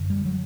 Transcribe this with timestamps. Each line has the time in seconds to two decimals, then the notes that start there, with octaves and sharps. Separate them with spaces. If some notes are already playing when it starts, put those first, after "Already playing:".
Already playing: F#2 D3
0.10 G3
0.25 F#3